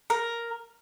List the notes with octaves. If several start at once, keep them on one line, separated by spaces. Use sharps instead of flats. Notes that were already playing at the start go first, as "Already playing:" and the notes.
A#4